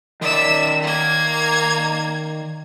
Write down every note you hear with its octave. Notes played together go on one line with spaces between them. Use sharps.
D#3 D5 E5 E6
A#3 G#6